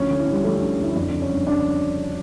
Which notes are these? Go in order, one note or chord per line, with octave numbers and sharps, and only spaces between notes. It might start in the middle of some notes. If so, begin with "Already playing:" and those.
Already playing: D2 F3 C#4
D3
E4
D3 G3
F3 A3
D2 C#4
D2 E4
E4
F2 D4
C#3 D4
C#4
G1 D4
C#3 D4